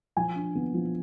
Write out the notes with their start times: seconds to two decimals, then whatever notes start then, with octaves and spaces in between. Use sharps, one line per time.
0.17 F3 G#5
0.36 D4
0.55 B3
0.74 F3